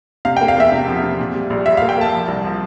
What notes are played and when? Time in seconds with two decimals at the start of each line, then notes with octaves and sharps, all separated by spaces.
0.25 C3 F5
0.37 G5
0.41 A#3
0.48 F5
0.57 E2 E5
0.72 C3
0.88 F3
1.03 C3
1.19 A#2
1.35 G3
1.50 A#1
1.66 G3 E5
1.77 F5
1.82 A#3
1.89 G5
1.98 A#3 A5
2.13 F3
2.28 C2
2.44 F3